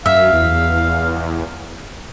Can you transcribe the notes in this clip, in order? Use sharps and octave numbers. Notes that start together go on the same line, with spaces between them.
F#2 E5 F5
E2